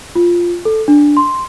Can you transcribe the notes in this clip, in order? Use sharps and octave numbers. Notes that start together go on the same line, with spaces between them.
F4
A4
D4
C6